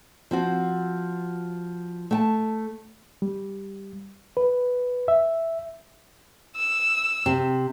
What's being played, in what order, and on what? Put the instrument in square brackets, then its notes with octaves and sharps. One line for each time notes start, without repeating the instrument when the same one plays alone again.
[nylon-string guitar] F3 C4 F#4
A3 G5 A5
[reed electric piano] G3
B4
E5
[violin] E6
[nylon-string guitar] C3